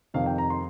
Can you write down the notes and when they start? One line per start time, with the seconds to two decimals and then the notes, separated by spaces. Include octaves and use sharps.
0.14 F2 C3 D#3 F5
0.26 G5
0.38 A#5
0.50 C6